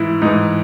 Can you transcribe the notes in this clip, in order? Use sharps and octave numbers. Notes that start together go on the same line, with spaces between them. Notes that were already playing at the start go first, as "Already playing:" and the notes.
Already playing: G#2 E3 E4
G#2 E3 D#4